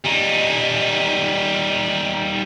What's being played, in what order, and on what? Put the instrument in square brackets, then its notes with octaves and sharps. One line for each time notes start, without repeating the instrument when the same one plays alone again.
[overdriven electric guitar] G3 D#4